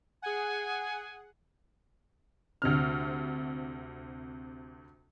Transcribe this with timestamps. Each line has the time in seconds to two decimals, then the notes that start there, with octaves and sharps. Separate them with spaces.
0.22 G#4 F#5 G#5
2.62 D2 C3 F6